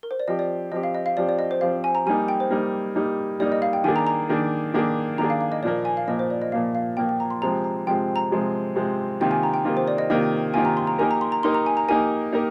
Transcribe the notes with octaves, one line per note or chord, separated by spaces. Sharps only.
A#4
C5
D5
F3 C4 G4 D#5
D5
F3 C4 G4 D#5
F5
D#5
F5
F3 C4 G4 D5
D5
D#5
C5
F3 C4 G4 F5
G#5
A#5
G3 A#3 D#4 G#5
G5
C5
G3 A#3 D#4
G3 A#3 D#4
G3 A#3 D#4 D5
D#5
F5
G5
D#3 A#3 D4 G#4 G#5
A#5
A#5
D#3 A#3 D4 G#4
D#3 A#3 D4 G#4
D#3 A#3 D4 G#4 A#5
F5
F5
D#5
A#2 F3 A#3 D5
G#5
F5
A#2 F3 A#3 D#5
C5
D5
D#5
A#2 F3 A#3 F5
F5
A#2 F3 A#3 G5
G5
A#5
C6
C3 F3 G#3 C4 A#5
A#5
C3 F3 G#3 C4 G5
A#5
C3 F3 G#3 C4
C3 F3 G#3 C4
C3 D#3 A#3 F4 G5
G#5
A#5
G5
C3 D#3 A#3 F4
C5
D5
D#5
C3 D#3 A#3 F4 D#5
C3 D#3 A#3 F4 G#5
A#5
C6
A#5
A#3 D#4 G4 A#4 G#5
A#5
C6
A#5
A#3 D#4 G4 A#4 C6
A#5
G#5
A#5
A#3 D#4 G4 A#4 G#5
A#3 D#4 G4 A#4